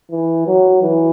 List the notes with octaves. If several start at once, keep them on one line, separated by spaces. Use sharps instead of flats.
E3
F#3
E3